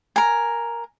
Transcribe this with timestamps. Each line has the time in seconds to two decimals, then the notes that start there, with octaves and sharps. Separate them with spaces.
0.16 A#4 G#5